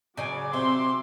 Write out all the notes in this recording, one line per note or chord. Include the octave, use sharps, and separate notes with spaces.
C#3 F#3 D5 G#5 D6
C3 E5 C6